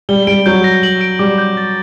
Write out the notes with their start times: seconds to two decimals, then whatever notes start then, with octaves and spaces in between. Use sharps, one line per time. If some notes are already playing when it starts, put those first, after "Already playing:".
0.09 G3 G7
0.27 G3 D7
0.46 F#3 G6
0.64 A#6
0.83 F#7
1.01 D7
1.19 G3 D6
1.38 G6
1.57 A6